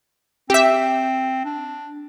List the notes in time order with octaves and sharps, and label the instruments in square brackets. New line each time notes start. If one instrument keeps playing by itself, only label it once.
[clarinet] C4 [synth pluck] G4 E5
[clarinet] D4